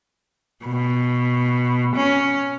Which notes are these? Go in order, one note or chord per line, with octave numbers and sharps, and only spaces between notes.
B2
C#4